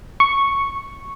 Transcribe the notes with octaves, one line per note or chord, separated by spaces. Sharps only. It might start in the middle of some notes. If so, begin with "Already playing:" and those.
C#6